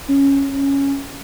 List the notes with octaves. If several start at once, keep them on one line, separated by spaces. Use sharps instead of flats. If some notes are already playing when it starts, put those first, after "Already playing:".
C#4